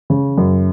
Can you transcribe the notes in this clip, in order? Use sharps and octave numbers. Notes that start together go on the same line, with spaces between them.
C#3
F#2